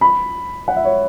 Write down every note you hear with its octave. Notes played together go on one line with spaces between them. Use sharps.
B5
F#5
E5
C#5